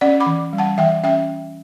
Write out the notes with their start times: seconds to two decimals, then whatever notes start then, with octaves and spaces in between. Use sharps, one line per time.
0.01 C#4 D5 F#5
0.20 B5 D6
0.26 E3
0.53 G3
0.58 F#5 A5
0.78 E3 E5 G5
1.03 C#4 E5 G5